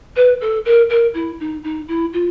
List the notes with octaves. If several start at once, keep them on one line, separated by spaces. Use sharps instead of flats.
B4
A4
A#4
A#4
E4
D#4
D#4
E4
F4